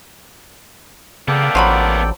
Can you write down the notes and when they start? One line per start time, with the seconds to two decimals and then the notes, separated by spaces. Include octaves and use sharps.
1.28 C#3 A#3 B3 A4 D5 G5
1.55 A1 F3 F#3 B5